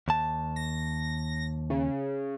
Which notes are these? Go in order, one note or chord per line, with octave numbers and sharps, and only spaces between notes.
D#2 A5
A#6
C#3